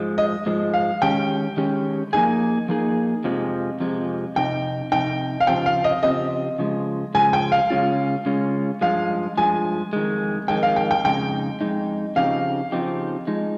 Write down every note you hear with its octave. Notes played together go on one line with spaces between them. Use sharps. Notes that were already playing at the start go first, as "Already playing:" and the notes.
Already playing: G#2 F3 G#3
D#5
G#2 F3 G#3
F5
D#3 G#3 C#4 G4 G5
D#3 G#3 C#4 G4
F3 A#3 D#4 G#4 G#5
F3 A#3 D#4 G#4
F2 C3 F3 G#3
F2 C3 F3 G#3
F2 C3 D#4 G5
F2 C3 D#4 G5
F5
C#3 F3 C4 G4 G5
F5
D#5
C#3 F3 C4 G4 D#5
C#3 F3 G#3
C#3 F3 G#3 G#5
G5
F5
C#3 G#3 C#4 F4
C#3 G#3 C#4 F4
G2 F3 G#3 F5
G2 F3 G#3 G#5
F2 D#3 G#3
F2 D#3 G#3 G5
F5
G5
G5
F2 C#3 G#3 D#4 G5
F2 C#3 G#3 D#4
C#3 F3 C4 D#4 G4 F5
C#3 F3 C4 D#4 G4
F3 G#3 D#4